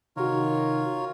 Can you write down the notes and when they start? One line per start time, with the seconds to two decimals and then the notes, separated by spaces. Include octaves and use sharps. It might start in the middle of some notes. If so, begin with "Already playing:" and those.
0.17 C3 D#3 F4 F#4 A#4 C#5